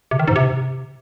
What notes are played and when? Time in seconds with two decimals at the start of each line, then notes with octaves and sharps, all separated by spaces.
0.11 C3
0.19 D#3
0.28 G#2
0.36 C3